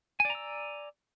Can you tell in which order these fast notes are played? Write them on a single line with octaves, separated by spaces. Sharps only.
G#5 D5 A#5 E6